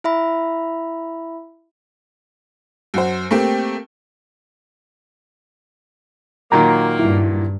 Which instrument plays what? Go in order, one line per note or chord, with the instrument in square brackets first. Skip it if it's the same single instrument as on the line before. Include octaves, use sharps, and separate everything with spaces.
[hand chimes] E4 E5 B5
[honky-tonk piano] F#2 F#4 C5
A3 A#3 C4 G4
[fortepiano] A#2 D#3 F#3 [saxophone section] A#3 [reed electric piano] A#5
[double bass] G2 [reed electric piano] E4